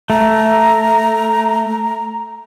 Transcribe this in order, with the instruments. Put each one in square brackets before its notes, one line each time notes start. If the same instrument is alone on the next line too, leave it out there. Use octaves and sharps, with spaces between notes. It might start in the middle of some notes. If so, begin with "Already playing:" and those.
[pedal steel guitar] A3 [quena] A#5